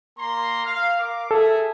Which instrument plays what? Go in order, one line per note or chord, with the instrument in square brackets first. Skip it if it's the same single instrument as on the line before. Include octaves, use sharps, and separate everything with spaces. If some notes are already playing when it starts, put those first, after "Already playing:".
[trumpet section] A#3 A#5 C6
F5
A#4 F5 D6
[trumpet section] G#4 E5 [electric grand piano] A4